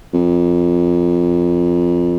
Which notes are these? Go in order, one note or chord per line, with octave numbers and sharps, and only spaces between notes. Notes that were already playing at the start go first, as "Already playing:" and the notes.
F2